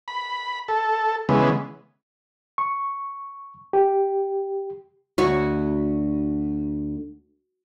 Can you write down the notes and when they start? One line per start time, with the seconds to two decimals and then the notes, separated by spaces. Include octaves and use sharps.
0.08 B5
0.68 A4
1.29 C#3 E3 G#3 B3
2.58 C#6
3.73 G4
5.18 D2 F#4 C#5